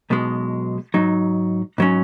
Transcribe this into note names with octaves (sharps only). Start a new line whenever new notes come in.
B1 B2 G#3
G#2 F#3 D#4
G#2 F#3 C#4